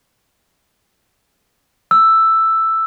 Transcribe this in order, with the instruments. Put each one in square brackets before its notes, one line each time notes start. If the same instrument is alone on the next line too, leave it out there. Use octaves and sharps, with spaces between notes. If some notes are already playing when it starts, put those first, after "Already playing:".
[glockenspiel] E6